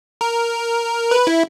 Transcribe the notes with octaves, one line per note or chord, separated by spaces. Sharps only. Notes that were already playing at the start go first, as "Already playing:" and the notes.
A#4
B4
E4